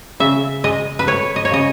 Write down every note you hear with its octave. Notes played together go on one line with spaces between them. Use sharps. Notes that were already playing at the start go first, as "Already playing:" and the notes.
C#3 E5
G#3 D#5
B4
A3 C#5
D#5
C#5
C#3 D#5